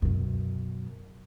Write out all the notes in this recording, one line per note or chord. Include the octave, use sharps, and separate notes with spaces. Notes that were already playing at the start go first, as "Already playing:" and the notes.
F#2 B2